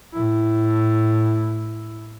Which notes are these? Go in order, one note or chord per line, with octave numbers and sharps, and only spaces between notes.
A2 E4